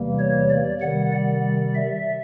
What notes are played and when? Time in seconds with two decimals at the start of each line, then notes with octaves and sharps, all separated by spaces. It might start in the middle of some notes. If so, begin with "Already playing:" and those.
Already playing: E2 C3 E3 G3 A#3
0.19 C#5
0.50 D5
0.81 C3 D#3 G3 F#5
1.13 D5
1.74 E5